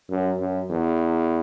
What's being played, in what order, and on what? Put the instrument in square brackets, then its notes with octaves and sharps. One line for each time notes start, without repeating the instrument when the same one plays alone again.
[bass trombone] F#2
F#2
E2